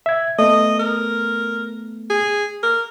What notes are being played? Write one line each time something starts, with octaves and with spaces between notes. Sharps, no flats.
E5 G#6
A3 B3 D#5
A#4
G#4
A#4